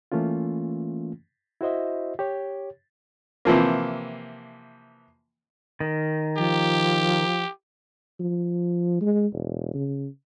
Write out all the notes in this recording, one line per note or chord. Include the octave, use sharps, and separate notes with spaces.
E3 A3 A#3 C#4 F4
E4 F#4 C5 D#5 E5
G4 C#5
C3 E3 F3 A#3
D#3
F3 G4
F3
G#3
E1
C#3